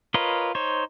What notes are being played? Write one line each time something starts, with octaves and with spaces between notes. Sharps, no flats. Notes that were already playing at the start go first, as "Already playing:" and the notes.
F4 A#4 B4 C#5 D#5
D#4 C5 C#5